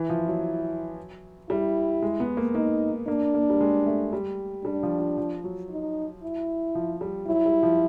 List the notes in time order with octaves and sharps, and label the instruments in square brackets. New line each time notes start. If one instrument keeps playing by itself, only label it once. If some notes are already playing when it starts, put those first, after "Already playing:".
Already playing: [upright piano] E3 [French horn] E4
[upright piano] F3
F#3
[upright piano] G3 [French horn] E4
[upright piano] G#3
B3
A#3
[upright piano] A#3 [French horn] D#4
[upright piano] A#3 [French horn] D4
[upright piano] A#3
G3
G#3
A3
G3
[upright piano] G3 [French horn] D4
[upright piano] F3
F3
F3
F#3
[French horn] D#4
E4
[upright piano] F3
G3
[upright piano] F#3 [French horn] E4
[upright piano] G3
F3